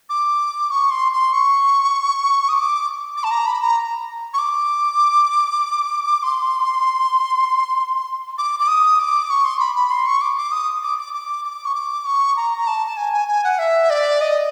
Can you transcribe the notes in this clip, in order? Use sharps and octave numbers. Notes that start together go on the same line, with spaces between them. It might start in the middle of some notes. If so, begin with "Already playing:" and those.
D6
C#6
C6
C6
C#6
D#6
D6
D6
A5
A#5
B5
A#5
C#6
D6
C6
D6
D6
D#6
D6
C#6
C6
B5
B5
C6
C#6
D6
D6
D#6
D6
D6
D6
D6
C#6
D6
C#6
A#5
A#5
A5
A5
G#5
G#5
G#5
F#5
E5
D5
D#5